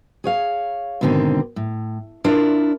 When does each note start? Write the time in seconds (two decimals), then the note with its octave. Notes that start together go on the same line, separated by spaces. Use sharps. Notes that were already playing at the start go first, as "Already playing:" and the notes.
0.24 G#4 C#5 F5
1.01 G#2 B2 D3 D#3 C4
1.56 A2
2.24 D4 E4 F4 A#4 D5